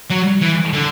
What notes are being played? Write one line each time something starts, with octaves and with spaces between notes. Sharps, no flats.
F#3
E3
D3